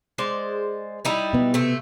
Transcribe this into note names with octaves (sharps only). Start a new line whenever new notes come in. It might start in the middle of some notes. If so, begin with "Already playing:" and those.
G#3 C5 D5
G3 D#4 E4
B2 B3
C3 A3